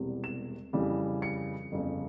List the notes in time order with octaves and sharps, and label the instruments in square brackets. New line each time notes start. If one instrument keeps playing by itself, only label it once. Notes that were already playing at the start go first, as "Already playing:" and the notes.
Already playing: [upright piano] E1 E2 C3 G3
E7
F2 C#3 E3 G3
C#7
G1 F2 C#3